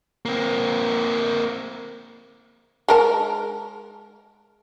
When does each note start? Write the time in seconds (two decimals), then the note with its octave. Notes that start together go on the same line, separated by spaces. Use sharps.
0.25 A#3 C4
2.88 G#3 A#4 A5